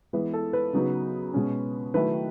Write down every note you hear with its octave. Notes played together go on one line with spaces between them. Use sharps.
E3 G#3 B3 B4
A4
B4
C#3 F#3 B3 D#4
B2 G#3 C#4
D#3 F#3 A3 E4 B4